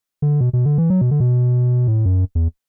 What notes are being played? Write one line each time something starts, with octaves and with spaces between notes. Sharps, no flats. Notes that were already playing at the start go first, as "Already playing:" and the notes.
D3
B2
B2
D3
E3
F#3
B2
D3
B2
A2
F#2
E2